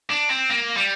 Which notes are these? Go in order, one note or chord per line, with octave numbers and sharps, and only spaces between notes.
D4
C4
A#3
G3